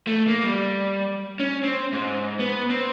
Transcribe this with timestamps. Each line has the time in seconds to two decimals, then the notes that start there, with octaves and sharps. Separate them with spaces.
0.07 A3
0.28 A#3
0.44 G3
1.40 C#4
1.63 C4
1.93 G#2
2.39 B3
2.70 C4